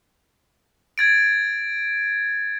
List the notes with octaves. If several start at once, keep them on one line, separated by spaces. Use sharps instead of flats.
G#6 A6 D7